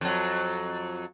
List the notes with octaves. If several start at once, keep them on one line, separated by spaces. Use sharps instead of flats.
F2 F#3